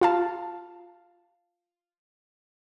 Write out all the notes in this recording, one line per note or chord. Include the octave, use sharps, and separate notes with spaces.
F4 F5 A5